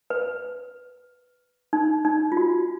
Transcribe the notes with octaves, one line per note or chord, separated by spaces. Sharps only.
B4
D#4
D#4
F4
F#4